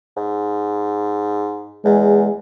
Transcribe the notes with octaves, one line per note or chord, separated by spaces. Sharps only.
G#2
E2 G#3